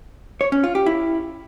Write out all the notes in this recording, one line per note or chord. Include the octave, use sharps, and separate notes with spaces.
C#5
C#4
F4
G4
E4